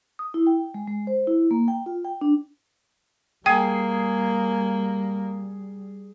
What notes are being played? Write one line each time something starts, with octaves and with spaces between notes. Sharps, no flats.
D#6
E4
G5
G#3
G#3
C5
E4
A#3
G5
F4
G5
D4
G3 A#3 G#4 G5